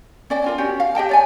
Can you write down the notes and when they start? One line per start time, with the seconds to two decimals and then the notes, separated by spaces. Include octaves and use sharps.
0.30 C#4 D5 G5
0.44 D4 F4 A#4
0.58 C#4 F#4 G4
0.80 F5
0.95 G4 D#5 G5 A5
1.09 C#5 D5 G#5